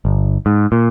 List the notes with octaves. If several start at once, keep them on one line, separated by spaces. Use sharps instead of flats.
G1
G#2
A#2